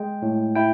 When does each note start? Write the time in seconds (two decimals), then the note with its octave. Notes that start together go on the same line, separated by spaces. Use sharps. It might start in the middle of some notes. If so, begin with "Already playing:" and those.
Already playing: G#3 G5
0.22 A2
0.55 E4 G5